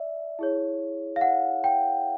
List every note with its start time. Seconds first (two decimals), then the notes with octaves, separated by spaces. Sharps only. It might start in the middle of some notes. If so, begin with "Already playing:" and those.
Already playing: D5 E5
0.39 E4 G#4 C#5
1.16 F5
1.21 F#5
1.64 G5